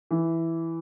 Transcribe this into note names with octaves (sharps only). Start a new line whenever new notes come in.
E3